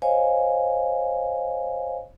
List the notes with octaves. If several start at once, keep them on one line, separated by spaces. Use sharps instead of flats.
C5 C#5 D#5 F5 G#5